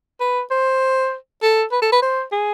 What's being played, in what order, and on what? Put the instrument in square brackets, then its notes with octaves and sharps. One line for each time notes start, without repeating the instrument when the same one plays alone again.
[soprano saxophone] B4
C5
A4
B4
A4
B4
C5
G#4